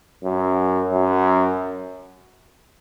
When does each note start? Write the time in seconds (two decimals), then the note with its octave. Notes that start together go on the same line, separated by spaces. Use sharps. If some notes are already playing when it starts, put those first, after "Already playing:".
0.24 F#2
0.90 F#2